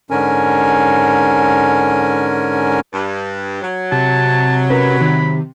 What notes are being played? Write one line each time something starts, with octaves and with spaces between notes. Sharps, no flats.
G#2 D3 C#4 A#4 G#5
G2
F#3
C3 A5
C#4 A#4 B4 B5
D#3